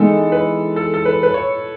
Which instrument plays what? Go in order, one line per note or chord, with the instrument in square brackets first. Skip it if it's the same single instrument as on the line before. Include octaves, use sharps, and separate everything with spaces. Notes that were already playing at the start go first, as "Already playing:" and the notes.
Already playing: [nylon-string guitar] E3 G#3 B3 D#4 [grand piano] A4
[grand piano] B4
A4
A4
B4
B4
C#5